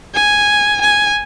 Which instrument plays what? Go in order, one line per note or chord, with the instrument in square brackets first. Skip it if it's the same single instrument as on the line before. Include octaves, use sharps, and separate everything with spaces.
[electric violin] G#5
G#5